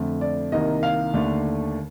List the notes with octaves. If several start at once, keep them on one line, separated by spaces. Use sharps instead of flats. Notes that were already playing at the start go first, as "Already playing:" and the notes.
Already playing: F2 D3 A3
D5
C2 C3 D#3 A#3 D#5
F5
D#2 D3 A3 D4